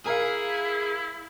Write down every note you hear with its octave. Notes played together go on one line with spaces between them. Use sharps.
E4 G#4 A#4 F5